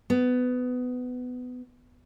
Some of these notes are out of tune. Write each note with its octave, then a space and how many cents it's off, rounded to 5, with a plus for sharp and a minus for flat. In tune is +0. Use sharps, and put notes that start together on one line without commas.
B3 +20